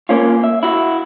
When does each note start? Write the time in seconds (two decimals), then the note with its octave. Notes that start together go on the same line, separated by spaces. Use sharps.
0.09 A#3 C#4 F4
0.44 E5
0.63 E4 F#4